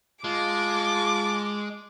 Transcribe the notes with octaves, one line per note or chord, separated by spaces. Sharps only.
G#3 F4 A5 D6